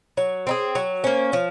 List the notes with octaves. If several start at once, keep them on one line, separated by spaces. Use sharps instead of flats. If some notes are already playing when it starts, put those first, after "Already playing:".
F#3 C#5
C4 D#4 G#4
F#3 C#5
A#3 C#4 C5
F3 C#5